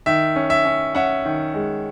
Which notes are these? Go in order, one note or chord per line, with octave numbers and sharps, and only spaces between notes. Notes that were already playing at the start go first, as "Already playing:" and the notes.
D#3 E5
C#4
E5
C#4
C#4 E5 F#5
D#3
G#3